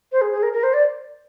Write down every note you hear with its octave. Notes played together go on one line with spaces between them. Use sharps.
C5
G#4
G#4
A#4
A#4
C5
D5